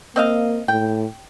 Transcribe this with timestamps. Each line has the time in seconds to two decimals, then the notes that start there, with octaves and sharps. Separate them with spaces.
0.16 A#3 C4 D#5 F5
0.68 A2 G5